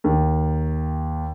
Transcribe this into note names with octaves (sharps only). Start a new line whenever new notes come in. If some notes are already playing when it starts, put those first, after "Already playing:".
D#2